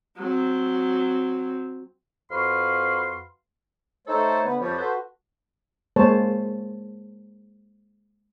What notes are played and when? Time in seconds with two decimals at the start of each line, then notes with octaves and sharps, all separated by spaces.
0.17 F#3 C4
2.30 F2 F#4 B4 F5 C6
4.07 A3 D#4 A4 C5 C#5
4.43 D3 B3 B4
4.60 F2 F3 G3 C#5
4.78 F#4 A4 B4 C5
5.96 G#3 A#3 C5 C#5 A5